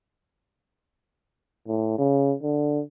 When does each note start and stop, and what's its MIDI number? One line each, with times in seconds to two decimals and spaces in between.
1.68 1.98 45
1.99 2.34 49
2.43 2.81 50